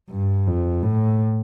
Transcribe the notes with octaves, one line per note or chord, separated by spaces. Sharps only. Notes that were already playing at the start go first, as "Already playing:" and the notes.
G2
F2
A2